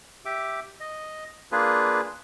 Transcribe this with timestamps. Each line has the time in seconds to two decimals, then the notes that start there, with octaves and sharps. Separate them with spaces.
0.25 G4 E5 D6
0.80 D#5
1.52 A#3 D4 F4 G#4 B4